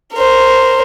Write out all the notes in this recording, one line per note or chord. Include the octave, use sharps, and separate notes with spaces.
A#4 C5